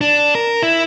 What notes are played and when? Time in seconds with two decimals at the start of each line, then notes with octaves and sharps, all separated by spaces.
0.01 D4
0.35 A#4
0.63 E4